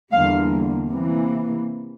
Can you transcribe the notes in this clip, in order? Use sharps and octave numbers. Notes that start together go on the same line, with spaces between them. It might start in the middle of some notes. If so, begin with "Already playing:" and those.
E2 D3 G3 A#3 F5
C3 E3 A#3